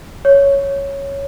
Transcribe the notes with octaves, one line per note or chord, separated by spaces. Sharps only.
C#5